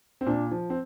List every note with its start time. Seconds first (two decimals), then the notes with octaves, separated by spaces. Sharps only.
0.21 C4
0.26 A#2 D4
0.51 F3
0.70 C4